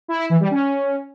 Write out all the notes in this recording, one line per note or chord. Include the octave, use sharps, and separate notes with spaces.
E4
E4
E3
G3
C#4